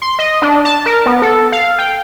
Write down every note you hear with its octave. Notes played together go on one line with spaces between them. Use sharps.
C6
D#5
D4
A5
A#4
B3
A4
F5
G5